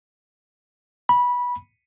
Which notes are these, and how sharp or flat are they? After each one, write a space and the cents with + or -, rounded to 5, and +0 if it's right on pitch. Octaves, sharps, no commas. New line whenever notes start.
B5 -15